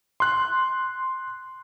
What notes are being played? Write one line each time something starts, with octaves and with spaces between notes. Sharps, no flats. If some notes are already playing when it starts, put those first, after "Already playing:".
C6 F#6